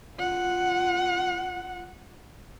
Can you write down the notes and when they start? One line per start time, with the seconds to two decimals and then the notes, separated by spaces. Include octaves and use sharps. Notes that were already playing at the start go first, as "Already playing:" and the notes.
0.16 F4 F#5